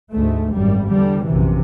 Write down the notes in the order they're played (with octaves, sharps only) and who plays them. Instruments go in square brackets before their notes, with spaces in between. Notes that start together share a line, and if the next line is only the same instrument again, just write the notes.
[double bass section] D2 G#2 A3
G#1 F#2 G3
E2 D3 G3
A#1 F#2 C3 E3